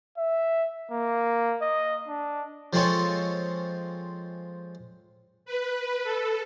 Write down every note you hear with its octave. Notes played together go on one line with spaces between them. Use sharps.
E5
A#3
D#5
D4
F3 G#3 C4 F4 A4 C#5
B4
A4